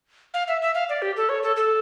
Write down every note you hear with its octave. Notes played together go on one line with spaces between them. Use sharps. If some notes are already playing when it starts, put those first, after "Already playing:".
F5
E5
E5
F5
D5
G4
A4
C#5
A4
A4